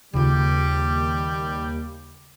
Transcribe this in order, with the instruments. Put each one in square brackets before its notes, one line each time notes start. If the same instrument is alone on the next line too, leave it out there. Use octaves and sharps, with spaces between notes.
[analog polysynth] D#2 [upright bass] C#3 F4 [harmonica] G3